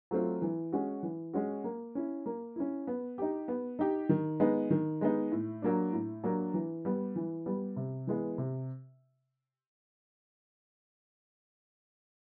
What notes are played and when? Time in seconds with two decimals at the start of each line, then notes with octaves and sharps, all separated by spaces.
0.11 F#3 A3 C4 F4
0.42 E3
0.73 G#3 C#4 F#4
1.03 E3
1.33 G#3 C#4 F#4
1.64 A#3
1.95 C#4 E4
2.26 A#3
2.56 C#4 E4
2.87 B3
3.18 D#4 G4
3.48 B3
3.79 D#4 G4
4.09 D#3
4.40 G#3 B3 D#4
4.70 D#3
5.01 G#3 B3 D#4
5.32 A2
5.62 F#3 A#3 D4
5.93 A2
6.24 F#3 A#3 D4
6.54 E3
6.85 G3 B3
7.16 E3
7.46 G3 B3
7.76 C3
8.07 E3 G#3 B3
8.38 C3